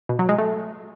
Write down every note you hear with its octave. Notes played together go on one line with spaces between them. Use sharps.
B2
F#3
G#3
A3